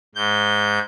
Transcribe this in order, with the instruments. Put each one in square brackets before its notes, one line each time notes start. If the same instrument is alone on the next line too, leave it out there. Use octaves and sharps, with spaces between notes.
[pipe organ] G#2 G6